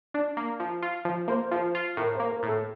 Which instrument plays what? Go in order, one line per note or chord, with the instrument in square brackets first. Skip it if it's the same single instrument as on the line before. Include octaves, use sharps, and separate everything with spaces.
[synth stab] D4
A#3
F3
F4
F3
[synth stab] A#3 [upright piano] C5
[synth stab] F3 [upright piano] C5
[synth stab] F4
[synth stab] A2 [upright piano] A#4
[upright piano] C5
[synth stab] A#3
[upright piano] A#4
[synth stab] A2
[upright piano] A4